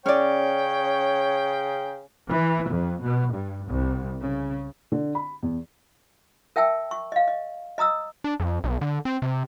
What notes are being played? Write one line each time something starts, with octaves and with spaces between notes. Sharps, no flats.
C#3 C#4 C#5 D5 G5
E3
F2
B2
G2
C2
C#3
D3
B5
E2
A#4 E5 G5 A5 E6
C#6
D#5 F5
D#5
D#5 A#5 D#6 E6
D4
F2
B1
D3
C4
C3